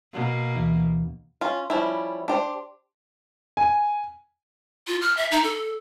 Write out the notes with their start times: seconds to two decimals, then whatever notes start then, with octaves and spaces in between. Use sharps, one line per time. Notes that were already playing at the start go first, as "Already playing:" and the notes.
0.14 B2 A#3
0.56 D2 E3
1.41 C#4 F4
1.70 F3 G3 C#4 E4
2.28 D4 G4 C5
3.57 G#5
4.87 F4
5.01 F6
5.17 E5
5.31 D#4
5.44 A4